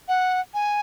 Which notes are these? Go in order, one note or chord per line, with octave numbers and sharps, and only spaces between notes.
F#5
G#5